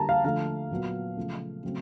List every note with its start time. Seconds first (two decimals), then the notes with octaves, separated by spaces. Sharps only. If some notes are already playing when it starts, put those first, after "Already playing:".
Already playing: D3 G3 A#3 A5 A#5
0.09 F5
0.24 D3 F3 A3 F5
0.71 A#2 F#3 B3
1.17 C#3 F3 A3
1.64 C#3 F#3 A3 C4